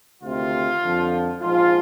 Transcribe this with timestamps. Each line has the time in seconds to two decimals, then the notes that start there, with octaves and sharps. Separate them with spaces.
0.21 D2 C3 D#3 F4
0.81 F2 D3 F3
1.41 A#1 G#2 F3 F4